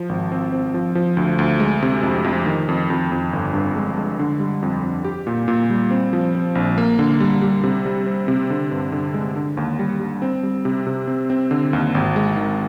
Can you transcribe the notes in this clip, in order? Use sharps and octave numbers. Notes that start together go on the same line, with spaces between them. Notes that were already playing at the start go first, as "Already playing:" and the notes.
Already playing: F3
G#1
C4
C4
F3
F3
D2
D2
G#3
C3
F2
F2
D#3
F2
F2
F2
G1
G2
G#3
G#3
D3
G3
F2
F2
G4
A#2
A#2
G3
C4
F3
C4
A#1
A#3
D3
G3
G3
C3
G3
C4
C3
D3
G2
D3
G#3
D3
D#2
G3
G3
C4
G3
C3
C3
C4
C4
D3
D#2
G#1
G#3
D#3